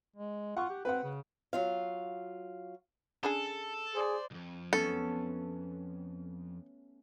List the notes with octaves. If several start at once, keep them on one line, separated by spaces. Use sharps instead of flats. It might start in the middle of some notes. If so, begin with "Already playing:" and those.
G#3
F4 F#5 C#6
G4
C4 B4 F#5
C#3
F#3 F4 F5
C#3 D4 G#4 A4
G#4 C5 D5
C2 F2
A3 B3 C#4 A4